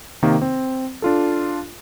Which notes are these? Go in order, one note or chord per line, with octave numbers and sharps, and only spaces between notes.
C3 D#3 A#3
C4
D4 F4 A4